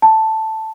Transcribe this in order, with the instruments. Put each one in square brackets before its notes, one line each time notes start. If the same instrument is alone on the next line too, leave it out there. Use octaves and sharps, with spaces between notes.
[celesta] A5